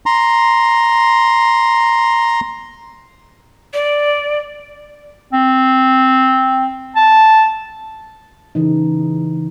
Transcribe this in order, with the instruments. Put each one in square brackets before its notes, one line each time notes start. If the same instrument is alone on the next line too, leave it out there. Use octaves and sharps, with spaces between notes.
[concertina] A#5 C6
[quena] D5
[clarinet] C4
A5
[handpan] C#3 E3 D#4